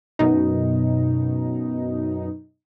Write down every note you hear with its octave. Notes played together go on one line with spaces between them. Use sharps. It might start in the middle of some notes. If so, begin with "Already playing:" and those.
F#2 B2 D#4